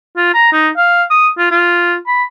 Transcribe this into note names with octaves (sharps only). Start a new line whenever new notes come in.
F4
A#5
D#4
F5
D#6
F4
F4
B5